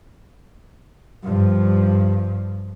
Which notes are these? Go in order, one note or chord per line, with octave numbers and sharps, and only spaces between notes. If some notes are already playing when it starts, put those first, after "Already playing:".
G2 F3